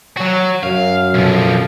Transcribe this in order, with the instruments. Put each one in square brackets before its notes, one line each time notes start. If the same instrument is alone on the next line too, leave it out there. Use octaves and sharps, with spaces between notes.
[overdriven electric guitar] F#3 F#4
[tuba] F#2 [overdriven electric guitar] F5
[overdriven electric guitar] B1 F3